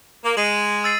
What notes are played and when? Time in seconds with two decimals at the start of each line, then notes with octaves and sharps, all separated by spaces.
0.24 A#3
0.37 G#3 D#7 F#7
0.84 E6 A6 C7